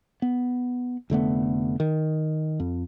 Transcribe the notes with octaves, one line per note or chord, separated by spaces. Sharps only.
B3
F1 D3 A3 B3
D#3
F2